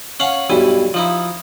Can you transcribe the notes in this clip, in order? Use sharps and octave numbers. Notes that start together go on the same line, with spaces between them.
C#4 F5 F#5
B1 G2 E4 G#5
F3 D#4 E4